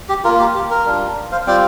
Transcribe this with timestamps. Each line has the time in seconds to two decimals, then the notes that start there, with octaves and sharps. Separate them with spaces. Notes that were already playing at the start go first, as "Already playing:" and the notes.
0.09 G4
0.24 F4 A#4
0.28 A#3
0.40 G4
0.55 G4
0.70 A#4
0.86 G3 D4 F4
1.31 C5 F5
1.47 G3 C4 F4 D5 G5